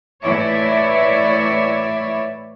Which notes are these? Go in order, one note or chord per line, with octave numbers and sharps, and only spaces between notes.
A2 E3 E4 C#5 D5 E5